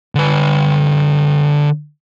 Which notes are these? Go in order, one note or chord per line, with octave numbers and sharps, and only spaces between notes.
D3 B4